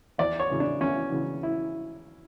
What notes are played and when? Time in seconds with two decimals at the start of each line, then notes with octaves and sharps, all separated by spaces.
0.18 E2 D5
0.39 C#5
0.50 C#3 E3
0.60 D4
0.80 E2 C#4
1.12 C#3 E3
1.43 E4